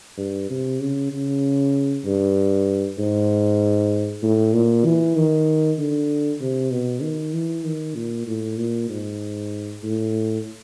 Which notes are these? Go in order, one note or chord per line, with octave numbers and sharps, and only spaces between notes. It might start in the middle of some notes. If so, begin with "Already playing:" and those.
G2
C3
C#3
C#3
G2
G#2
A2
A#2
E3
D#3
D3
C3
B2
D#3
E3
D#3
A#2
A2
A#2
G#2
A2